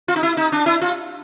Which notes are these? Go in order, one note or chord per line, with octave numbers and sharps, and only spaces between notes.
F4
D#4
E4
D#4
D4
E4
F4